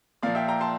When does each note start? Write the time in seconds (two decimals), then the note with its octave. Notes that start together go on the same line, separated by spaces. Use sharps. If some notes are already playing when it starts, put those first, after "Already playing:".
0.23 A#2 F3 D5 F5
0.35 E5 G5
0.48 G5 A#5
0.61 A5 C6